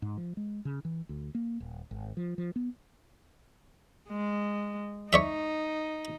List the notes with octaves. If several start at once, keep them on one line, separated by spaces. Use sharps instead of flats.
G#2
F3
G#3
C#3
E3
D2
A#3
D#1
G#1
F3
F3
B3
G#3
D#4 C#5 D5 E5